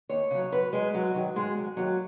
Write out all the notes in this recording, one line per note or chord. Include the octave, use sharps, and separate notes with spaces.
D#2 C#5
C#3 F#3
F#2 B4
F#3 G#3
F#2 F#3
D#3 F#3
G#2 G#3
F#3
D#2 F#3